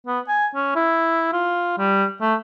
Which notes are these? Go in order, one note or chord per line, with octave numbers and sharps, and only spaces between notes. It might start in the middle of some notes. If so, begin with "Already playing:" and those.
B3
G#5
C#4
E4
F4
G3
A3